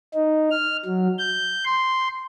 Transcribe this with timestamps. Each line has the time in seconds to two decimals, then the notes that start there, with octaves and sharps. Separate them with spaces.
0.14 D#4
0.51 F6
0.85 F#3
1.19 G6
1.65 C6